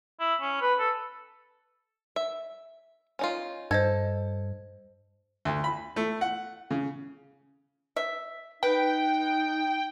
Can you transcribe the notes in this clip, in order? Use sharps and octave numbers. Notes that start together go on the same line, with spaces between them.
E4
C#4
B4
A4
E5
C#4 D#4 F4
G2 A4 C5 D#5 G#6
D2
B5
A3
F#5
C#3
E5
D#4 B4 G5